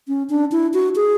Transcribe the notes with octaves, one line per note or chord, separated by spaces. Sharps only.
C#4
D4
E4
F#4
G#4